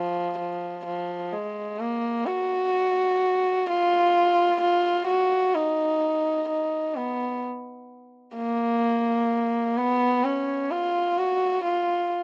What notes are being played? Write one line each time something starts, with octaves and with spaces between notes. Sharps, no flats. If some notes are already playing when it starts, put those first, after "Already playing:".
Already playing: F3
F3
F3
G#3
A#3
F#4
F4
F4
F#4
D#4
D#4
B3
A#3
B3
C#4
F4
F#4
F4